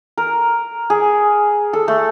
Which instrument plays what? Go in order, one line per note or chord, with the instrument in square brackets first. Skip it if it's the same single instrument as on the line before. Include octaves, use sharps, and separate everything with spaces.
[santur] A#4
G#4
A4
A3